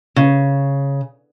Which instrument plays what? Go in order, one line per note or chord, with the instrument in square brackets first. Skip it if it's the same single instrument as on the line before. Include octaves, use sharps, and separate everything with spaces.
[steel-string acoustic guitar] C#3